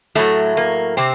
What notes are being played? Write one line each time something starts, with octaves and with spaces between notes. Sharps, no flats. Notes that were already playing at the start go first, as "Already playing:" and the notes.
A2 F#3 A3
A#3
C3 C4